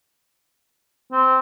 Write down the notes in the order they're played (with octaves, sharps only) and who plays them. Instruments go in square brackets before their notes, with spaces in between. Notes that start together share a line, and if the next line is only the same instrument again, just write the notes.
[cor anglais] C4